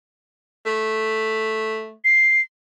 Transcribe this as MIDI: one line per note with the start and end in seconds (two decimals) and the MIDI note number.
0.66 1.93 57
2.05 2.42 96